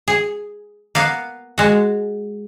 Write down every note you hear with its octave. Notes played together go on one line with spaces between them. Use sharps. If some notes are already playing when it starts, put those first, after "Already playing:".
G#4
A#3 B3 F5
G#3 F#4